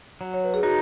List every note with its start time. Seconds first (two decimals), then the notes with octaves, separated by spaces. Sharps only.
0.21 F#3
0.34 C#5
0.44 B4
0.54 G#4
0.63 D#4 F#4